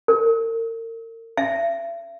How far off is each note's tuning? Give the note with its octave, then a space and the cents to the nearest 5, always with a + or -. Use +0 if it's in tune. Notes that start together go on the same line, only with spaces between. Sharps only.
A#4 -40
E5 +40